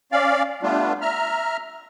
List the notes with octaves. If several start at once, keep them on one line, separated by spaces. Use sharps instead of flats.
C#4 D5 F5
G3 A3 B3 D4 F4
E5 A#5 F6